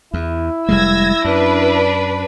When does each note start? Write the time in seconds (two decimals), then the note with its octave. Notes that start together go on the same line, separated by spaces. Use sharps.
0.14 E2 E4
0.69 F1 G3 G#3 E6 G#6 A#6
1.25 F#2 D4 B4